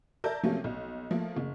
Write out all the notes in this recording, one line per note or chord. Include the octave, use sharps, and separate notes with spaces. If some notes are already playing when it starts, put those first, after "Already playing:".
A#4 D5 E5 A5 G6
C3 F3 F#3 A3 A#3 C#4
B1
F3 A3 A#3
F#1